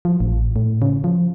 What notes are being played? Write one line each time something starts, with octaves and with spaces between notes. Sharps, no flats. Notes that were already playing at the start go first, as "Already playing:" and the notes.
F3
A1
A2
C#3
F3